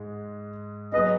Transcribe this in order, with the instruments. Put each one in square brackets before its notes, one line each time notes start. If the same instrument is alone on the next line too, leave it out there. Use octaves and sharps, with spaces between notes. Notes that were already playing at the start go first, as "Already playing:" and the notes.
Already playing: [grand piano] G#2 G#3
[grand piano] F#3 B3 G#4 B4 [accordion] D#5